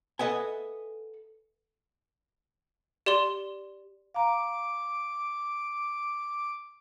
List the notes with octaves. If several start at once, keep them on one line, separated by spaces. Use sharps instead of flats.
A4 B4 D#5 E5 F#5 G#5
G4 D5 C6 G7
F5 A#5 D6